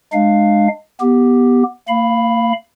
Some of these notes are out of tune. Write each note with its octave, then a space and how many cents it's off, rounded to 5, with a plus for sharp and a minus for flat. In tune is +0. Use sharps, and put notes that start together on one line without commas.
G#3 +0 D4 +35 F5 +0
B3 -10 G4 +0
A#3 -40 F5 +0 B5 +0